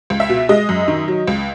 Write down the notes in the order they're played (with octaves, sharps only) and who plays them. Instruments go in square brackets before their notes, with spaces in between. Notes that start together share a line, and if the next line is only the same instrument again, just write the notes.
[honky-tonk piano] C#2
E5
B2
G#3 D#5
F#2
D#3
F#3
C#2